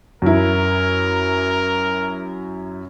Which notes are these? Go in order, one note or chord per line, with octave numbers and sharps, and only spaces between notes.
F#2 E4 A#4